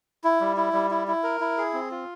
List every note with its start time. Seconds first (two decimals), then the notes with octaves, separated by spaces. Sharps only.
0.24 E4
0.41 G3
0.57 E4
0.73 G3
0.91 E4
1.08 E4
1.24 A#4
1.41 E4
1.58 G#4
1.73 C4
1.91 F4